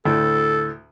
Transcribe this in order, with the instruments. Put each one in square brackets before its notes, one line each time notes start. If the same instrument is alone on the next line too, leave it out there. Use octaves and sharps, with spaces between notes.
[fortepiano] D2 A2 [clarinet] A4